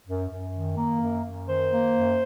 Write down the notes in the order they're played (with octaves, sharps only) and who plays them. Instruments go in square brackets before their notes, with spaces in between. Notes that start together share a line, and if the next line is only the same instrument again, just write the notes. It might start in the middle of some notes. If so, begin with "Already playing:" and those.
[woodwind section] F#2
F#2
D#3
A#3
F#2
F#2
D#3 C5
A#3
F#2